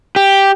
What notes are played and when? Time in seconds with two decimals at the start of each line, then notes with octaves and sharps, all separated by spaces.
0.16 G4